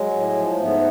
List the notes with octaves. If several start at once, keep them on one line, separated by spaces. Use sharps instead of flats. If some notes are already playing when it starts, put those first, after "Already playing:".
Already playing: F#3 G#3
A2
F3
G#2 A3 B3